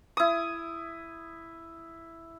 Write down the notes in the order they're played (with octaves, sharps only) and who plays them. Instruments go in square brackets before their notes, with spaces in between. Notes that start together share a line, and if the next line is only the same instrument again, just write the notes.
[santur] E4 D#6